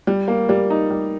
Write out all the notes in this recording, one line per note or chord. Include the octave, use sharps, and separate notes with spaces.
G3
A#3
G3
D#4
G3